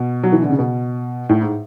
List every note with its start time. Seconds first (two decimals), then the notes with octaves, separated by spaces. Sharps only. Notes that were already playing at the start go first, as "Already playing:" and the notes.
Already playing: B2
0.23 F#3
0.32 E3
0.42 D3
0.50 C#3
0.59 B2
1.29 A2
1.41 G#2